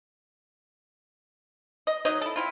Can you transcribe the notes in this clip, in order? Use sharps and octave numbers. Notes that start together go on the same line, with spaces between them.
D#5
F#3 D#4 C#5 D#5
E4 A4
C4 E4 F4